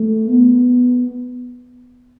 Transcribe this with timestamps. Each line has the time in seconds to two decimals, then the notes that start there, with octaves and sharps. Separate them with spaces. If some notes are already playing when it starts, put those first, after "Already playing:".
Already playing: A3
0.28 B3